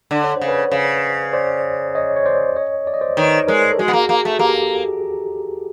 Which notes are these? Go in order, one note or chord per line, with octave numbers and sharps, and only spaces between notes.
D3 D5
C#5
C5
C#3
B4 C#5
C#3
C5 D5
C#5 D#5
C#5
C5 D5
C#5 D#5
D5
D#5
C5 D5
D#3 B4 C#5
G#3 A#4 C5
A4
G#3 F#4 G#4
B3
A#3
A#3
A3
A#3 G4 A4